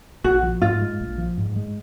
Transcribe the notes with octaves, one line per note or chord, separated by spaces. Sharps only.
A#1 F#4
F3
G#2 F4
G#3
A#1
F3
G#2
G#3